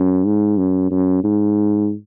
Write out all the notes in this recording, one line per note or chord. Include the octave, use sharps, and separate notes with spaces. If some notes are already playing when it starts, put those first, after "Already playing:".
Already playing: F#2
G#2
F#2
F#2
G#2